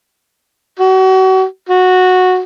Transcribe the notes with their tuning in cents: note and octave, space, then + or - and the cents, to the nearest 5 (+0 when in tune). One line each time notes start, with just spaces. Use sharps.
F#4 +35
F#4 -10